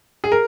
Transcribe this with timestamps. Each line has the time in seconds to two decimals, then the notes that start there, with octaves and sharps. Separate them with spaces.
0.24 G#4
0.32 A#4